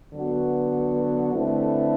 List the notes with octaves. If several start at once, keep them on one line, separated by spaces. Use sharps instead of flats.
D3 F#3 B3 F#4 B4
D3 A3 C4 E4 B4